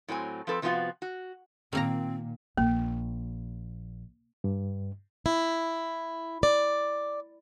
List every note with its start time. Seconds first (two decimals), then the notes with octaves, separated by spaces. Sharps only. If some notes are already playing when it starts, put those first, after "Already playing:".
0.08 A2 F#3 C4 G#5
0.47 F3 C4 A4 B4
0.62 C3 F3 F#3 B3 F4 F#4
1.02 F#4
1.73 A#2 D#3 A#3 C4 A#5
2.58 A#1 A#3
4.44 G2
5.26 E4
6.43 D5